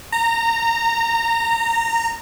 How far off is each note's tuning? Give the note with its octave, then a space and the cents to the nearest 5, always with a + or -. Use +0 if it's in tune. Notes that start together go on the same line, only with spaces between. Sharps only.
A#5 -20